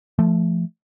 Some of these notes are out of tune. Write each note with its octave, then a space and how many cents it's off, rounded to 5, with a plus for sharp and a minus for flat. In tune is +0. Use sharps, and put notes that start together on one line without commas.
F3 -25 A3 +0